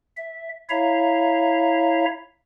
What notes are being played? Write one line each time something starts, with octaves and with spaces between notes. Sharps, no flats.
E5
E4 C#5 E5 F5 A#5